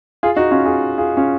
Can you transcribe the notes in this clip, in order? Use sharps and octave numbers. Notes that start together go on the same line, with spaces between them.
F4 G#4
D#4 F#4
C#4 F4
F4 G#4
F4 G#4
C#4 F4